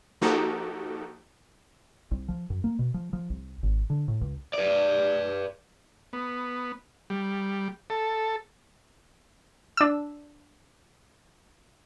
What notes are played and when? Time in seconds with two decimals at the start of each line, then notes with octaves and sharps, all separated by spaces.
0.22 F3 A#3 D#4 F#4 G4 A4
2.11 C2
2.28 F3
2.50 F#2
2.64 A#3
2.79 B2
2.94 F3
3.13 F3
3.30 C2
3.63 G#1
3.90 D3
4.08 A2
4.21 C#2
4.53 B4 D5
6.13 B3
7.10 G3
7.90 A4
9.77 D4 E6